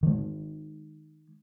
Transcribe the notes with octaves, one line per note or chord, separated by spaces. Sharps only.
D#3 G#3